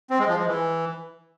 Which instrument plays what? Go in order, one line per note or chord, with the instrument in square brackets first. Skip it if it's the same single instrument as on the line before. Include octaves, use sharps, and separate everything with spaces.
[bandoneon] C4
G#3
F3
G#3
E3